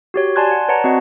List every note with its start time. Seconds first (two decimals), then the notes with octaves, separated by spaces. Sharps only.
0.14 F#4 G4 C#5
0.36 D5 G#5 A5 C6 F#6 G#6
0.51 F#5
0.68 B4 C#5 D5 F#5 A5 A#5
0.84 C4 F#4 C#5 D#5 F#5